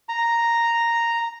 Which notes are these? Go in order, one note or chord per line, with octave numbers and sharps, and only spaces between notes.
A#5